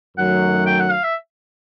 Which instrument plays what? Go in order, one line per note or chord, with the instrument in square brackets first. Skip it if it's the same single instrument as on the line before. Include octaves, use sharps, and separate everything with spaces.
[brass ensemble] F#2 D#3 F#3 A3 [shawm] F#5
[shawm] G5
F#5
F5
E5